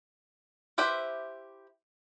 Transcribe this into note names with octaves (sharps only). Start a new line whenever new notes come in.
E4 G4 B4 C5 E5